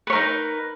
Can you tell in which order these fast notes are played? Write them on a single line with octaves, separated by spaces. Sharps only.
B4 C#5 A#4 D#4